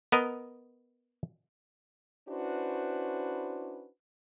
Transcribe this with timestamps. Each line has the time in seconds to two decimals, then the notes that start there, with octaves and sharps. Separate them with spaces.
0.12 B3 A#4 D#5
2.29 C#4 D4 E4 F#4 B4 C5